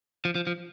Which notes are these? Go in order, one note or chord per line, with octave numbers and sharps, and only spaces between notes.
F3
F3
F3